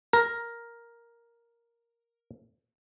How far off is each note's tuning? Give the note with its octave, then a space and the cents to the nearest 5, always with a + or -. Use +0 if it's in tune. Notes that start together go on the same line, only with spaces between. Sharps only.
A#4 +5